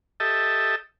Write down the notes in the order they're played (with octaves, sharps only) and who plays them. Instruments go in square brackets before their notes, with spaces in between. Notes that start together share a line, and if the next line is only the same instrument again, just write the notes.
[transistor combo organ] G4 A4 D#5 E5 A5